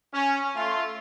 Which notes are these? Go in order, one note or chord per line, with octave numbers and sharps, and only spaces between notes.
C#4
A3 F4